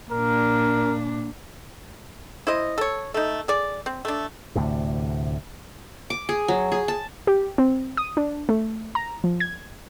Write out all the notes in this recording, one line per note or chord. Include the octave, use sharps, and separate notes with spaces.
A#2 D4 A#4
E4 C5 D#5
A4 C#5
A3 D#4
G#4 D5
C4
A3 D4
D2 A2 C3
D6
G#4
F#3
G#4
A5
G4
C4
D#6
D4
A3
A#5
F3
G#6